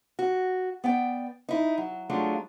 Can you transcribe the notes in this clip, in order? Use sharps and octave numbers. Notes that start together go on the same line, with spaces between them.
F#4
B3 D5 G5
D#4 E4
F#3
F#3 G#3 A3 D4 F4